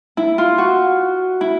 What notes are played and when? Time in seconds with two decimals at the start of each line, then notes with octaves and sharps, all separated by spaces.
0.17 E4
0.38 F4
0.58 F#4
1.41 E4